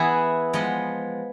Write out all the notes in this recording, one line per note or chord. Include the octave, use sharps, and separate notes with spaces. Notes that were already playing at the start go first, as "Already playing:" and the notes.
Already playing: E3 B3 E4 G#4
F3 G#3 B3